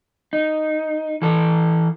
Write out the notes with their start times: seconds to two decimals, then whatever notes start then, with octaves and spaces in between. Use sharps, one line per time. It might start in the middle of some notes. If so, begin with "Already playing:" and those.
0.33 D#4
1.22 E3 A4